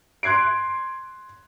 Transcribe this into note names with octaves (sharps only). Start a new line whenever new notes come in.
C6 F#6 G#6 C7 D7